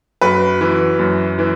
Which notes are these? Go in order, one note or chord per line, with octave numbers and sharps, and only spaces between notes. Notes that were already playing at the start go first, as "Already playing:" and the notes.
F#2 B4
E3
F#2
E3